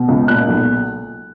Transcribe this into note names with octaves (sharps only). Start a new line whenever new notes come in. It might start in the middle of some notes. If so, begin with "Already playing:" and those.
Already playing: B2
C#2
A#2 F#6
B1